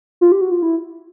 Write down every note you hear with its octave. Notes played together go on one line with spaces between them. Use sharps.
F4
G4
F#4
F4
E4